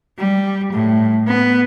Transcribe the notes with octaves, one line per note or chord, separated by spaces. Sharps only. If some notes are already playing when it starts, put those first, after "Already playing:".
G3
A2
B3